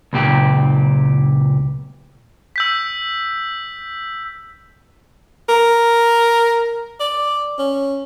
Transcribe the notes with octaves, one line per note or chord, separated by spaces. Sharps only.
C#2 A#2 G4
E6 G6 B6
A#4
D5
C#4